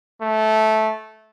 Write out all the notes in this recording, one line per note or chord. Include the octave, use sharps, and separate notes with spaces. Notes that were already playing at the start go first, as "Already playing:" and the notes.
A3